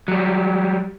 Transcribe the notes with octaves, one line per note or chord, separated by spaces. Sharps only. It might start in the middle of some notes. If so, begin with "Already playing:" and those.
F#3 G3